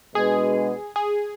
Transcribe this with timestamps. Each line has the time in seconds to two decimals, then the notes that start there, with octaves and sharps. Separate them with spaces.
0.15 B2 G#3 D4 F#4 G#4 B4
0.96 G#4